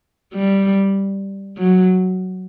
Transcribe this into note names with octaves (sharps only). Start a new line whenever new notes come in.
G3
F#3